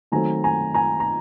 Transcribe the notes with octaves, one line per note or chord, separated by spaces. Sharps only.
D#3 F#3 A3 C4 G#5 A#5
G#5 A#5
G#5 A#5
A#5